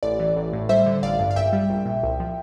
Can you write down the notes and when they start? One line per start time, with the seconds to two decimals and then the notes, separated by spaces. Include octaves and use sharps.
0.03 A1 D5
0.20 E3
0.36 A1
0.53 A2
0.69 G3 C5 E5
0.86 D3
1.03 A1 D5 F5
1.19 G2
1.31 F5
1.36 A#1 E5 G5
1.53 G3
1.70 A#1
1.86 A#2
2.03 C2
2.20 F3